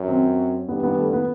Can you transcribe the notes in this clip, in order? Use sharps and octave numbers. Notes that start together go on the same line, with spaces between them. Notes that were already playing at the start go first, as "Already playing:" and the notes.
Already playing: F#2
C4
G2 B3
B3
A3
B3